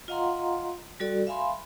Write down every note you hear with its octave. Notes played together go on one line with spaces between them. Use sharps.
F4 D#5 F5 F#5 A#5 C6
G3 F#4 A4 D5
E5 F5 G#5 B5 C6